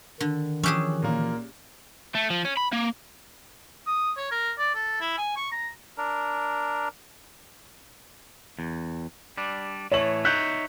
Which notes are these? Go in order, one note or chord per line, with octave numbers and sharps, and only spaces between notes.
D3 D#3
E3 F3 C#4 G4 G#4 E6 F#6 E7
A#2 A#3
A3
F3
C#4
B5
A#3
D#6
C#5
A#4
D5
A4
E4
G#5
C#6
A#5
D4 A#4
E2
G3 D4
A2 E3 A3 C#5 F#7
D#4 C#5 E5 F#6 G6